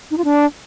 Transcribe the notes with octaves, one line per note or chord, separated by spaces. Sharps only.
D#4
F4
D4